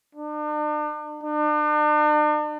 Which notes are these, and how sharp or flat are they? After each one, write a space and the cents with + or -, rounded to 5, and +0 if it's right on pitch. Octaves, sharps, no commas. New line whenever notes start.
D4 +40
D4 +40